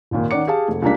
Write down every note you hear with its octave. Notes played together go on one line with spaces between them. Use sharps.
G#1 D#2 A#2
D#3 C#4 D5 F#5 D6 C#7
G4 G#4 F5 A5
F1
C#2 G3 A#3 D4 B6